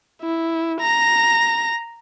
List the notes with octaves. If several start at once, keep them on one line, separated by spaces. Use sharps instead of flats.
E4
A#5 A#6